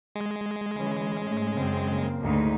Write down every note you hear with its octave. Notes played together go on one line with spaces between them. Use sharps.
G#3
D3 E3 C#4
G#2 A3 C#4
F#2 C#3 C4
C#3 A#3
D2 G#2 D#4